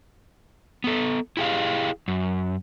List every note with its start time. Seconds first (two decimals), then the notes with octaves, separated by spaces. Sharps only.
0.84 B3 A4
1.37 E4 G4 G#4 F5
2.08 F#2